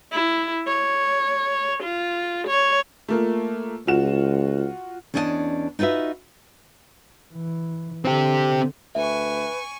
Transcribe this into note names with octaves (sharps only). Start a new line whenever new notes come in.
E4
C#5
F4
C#5
A3 A#3 F4
C#2 F4 F#4 E7
E2 C#4 D4 D#5 E5 A5
D#4 F4 F#4 B4 E5
E3
D3 C4 G4
D2 B4 E5 G#5 C#6